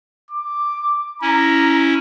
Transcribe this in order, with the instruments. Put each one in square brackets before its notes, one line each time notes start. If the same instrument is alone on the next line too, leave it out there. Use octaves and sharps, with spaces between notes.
[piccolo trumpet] D6
[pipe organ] C#4 E4 [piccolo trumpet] A#5